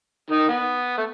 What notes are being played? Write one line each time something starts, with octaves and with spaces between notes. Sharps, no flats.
D#3 D#4
B3
A3